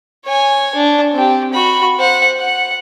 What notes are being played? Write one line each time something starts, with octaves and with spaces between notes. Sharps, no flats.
C#5 G#5
D4
C4 G4
F#4 B5
C5 F#5
F#5